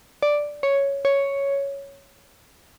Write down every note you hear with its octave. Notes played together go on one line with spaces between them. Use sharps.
D5
C#5
C#5